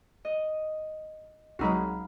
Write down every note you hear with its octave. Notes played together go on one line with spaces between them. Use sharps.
D#5
C2 F#3 G#3 D#4 F#4 F5 B5